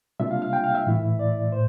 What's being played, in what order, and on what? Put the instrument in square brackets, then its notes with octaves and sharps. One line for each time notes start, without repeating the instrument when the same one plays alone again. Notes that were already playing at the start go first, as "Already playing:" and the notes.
[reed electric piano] C3 G3 A#3 D4 F4 E5
F5
F5
G5
F5
E5
A2 E3 A3 E4
D5
A2 C5